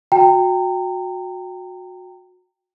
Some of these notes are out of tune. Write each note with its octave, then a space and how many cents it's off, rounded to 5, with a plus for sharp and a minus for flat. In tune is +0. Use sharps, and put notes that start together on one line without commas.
F#4 -25 G5 +0 A#5 -30